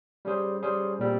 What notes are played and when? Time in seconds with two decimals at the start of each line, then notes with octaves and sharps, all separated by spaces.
0.25 G3 C#4 G#4 C5
0.63 G3 C#4 G#4 C5
0.99 A#2 G3 C4